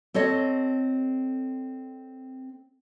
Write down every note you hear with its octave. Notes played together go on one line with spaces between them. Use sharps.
C4 A4 C#5 D#5